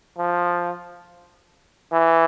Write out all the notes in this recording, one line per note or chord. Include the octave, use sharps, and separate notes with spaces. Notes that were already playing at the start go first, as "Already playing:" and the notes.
F3
E3